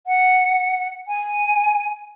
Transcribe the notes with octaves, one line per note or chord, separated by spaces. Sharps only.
F#5
G#5